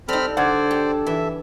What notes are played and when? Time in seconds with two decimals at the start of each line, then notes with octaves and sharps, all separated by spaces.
0.08 G3 C4 D#4 A4 B5 F6
0.37 D3 C5 D5 F#5 G#6
0.71 G4
1.07 E3 E4 E5